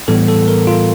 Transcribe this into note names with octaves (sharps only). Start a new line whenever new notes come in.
A2 E3 G3 B3 A4
A4
A#4
F4